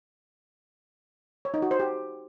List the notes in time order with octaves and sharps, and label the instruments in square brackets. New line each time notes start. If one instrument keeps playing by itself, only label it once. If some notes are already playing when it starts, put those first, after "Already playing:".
[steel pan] C#5
D#4
F#4
C5
G4